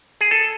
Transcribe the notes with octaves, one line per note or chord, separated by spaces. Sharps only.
G#4
A4